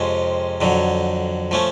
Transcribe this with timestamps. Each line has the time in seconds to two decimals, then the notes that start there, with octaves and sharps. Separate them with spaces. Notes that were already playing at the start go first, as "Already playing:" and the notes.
Already playing: F2 C3 F3 G#3 C#4
0.61 F2 D3 F#3
1.51 F3 A3 C#4